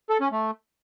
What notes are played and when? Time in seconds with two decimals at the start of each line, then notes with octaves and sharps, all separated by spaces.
0.10 A4
0.21 C#4
0.32 A3